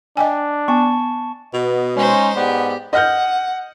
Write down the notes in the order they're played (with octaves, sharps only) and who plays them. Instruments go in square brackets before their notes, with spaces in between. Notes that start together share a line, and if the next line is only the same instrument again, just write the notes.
[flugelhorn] D4 [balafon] D#5 G5 G#5
[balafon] B3 [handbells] G#5 A5 C#6
[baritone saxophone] B2 [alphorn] B3 [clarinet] D#5
[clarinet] G#3 [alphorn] C#4 [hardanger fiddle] D#4 C5
[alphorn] G#2 [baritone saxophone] B3 [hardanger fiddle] G4 [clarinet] D5
[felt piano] D#5 F6 G6 [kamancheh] F#5